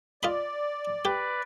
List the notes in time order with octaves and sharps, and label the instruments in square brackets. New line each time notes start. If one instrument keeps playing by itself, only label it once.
[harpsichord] F4 D#5 B5 [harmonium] D5
[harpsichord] G4 [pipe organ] B4 D5